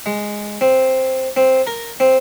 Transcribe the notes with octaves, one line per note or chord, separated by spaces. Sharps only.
G#3
C4
C4
A#4
C4